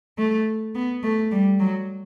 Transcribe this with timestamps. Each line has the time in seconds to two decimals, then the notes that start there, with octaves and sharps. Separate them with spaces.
0.18 A3
0.75 B3
1.03 A3
1.32 G3
1.60 F#3